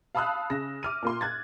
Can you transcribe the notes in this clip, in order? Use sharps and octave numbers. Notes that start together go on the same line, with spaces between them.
F5 A5 B5 D#6 E6 F#6
C#3 A#6
D6 F6 D#7
A#2 A#3 C6
F#6 G#6 A6